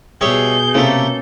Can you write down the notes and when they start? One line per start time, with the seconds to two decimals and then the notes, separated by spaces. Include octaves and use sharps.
0.21 B2 G3 G#4 C#5 E5 G6
0.74 C3 A3 A#3 C#4 A4